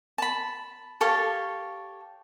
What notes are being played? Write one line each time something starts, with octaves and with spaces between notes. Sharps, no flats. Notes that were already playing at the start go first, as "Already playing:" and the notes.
A5 B5
G4 A4 C#5 F5